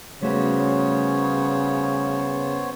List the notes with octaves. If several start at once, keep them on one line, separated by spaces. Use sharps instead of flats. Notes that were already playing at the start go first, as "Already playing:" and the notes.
C#3 G3 A3 B3 F#4 C5 C#5